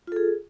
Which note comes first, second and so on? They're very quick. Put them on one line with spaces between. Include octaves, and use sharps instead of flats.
F4 A4 G#4